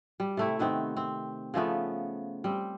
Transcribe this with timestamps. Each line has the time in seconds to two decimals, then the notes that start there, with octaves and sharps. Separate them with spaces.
0.20 G3
0.37 C3 A3 E4
0.59 C3 D#3 B3 C4
0.97 C4
1.54 C#3 F3 A3 B3
2.44 G3 C4